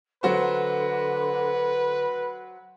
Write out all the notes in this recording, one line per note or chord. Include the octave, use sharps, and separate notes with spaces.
D3 F#3 F#4 B4 C5